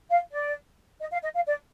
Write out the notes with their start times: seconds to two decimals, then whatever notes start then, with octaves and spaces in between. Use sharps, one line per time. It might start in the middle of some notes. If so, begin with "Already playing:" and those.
0.10 F5
0.32 D5
1.01 D#5
1.12 F5
1.23 D#5
1.35 F5
1.46 D5